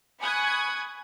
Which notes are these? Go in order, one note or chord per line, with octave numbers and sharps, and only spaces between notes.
G#5 B5 C#6 D#6 F#6 G#6